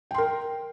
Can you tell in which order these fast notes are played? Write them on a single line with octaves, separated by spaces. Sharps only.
G5 C6 A#4